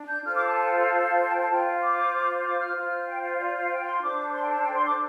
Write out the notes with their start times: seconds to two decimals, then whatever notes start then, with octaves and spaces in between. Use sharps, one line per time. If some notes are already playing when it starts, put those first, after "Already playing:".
Already playing: D4
0.09 G6
0.25 F4 A4 C5 F6
0.35 D6
0.47 A5
0.57 A5
0.66 G5
0.72 F5
0.89 F5
1.04 F5
1.20 F5
1.26 A5
1.29 G5
1.40 A5
1.50 F4 C5 G5
1.67 F5
1.82 D6
2.45 D6
2.60 F6
2.76 F4 C5
3.08 G5
3.23 F5
3.39 D5
3.55 F5
3.71 G5
3.86 C6
4.01 D4 A4 C5 D6
4.33 C6
4.42 G5
4.49 A5
4.64 G5
4.74 C6
4.86 D6